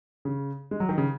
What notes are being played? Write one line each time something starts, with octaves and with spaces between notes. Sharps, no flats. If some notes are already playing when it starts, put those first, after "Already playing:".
C#3
G#3
F#3
D#3
C#3